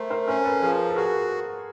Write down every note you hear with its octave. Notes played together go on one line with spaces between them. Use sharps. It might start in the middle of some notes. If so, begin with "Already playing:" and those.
Already playing: A3 A#4 C5
A#4 C5
C#4 A#4 C5
A4 B4
F3 G#4 A#4
A4
F#4 G#4 A#4